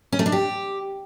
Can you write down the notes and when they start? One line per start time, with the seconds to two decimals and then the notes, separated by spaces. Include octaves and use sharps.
0.12 C#4
0.19 A3
0.26 D4
0.32 G4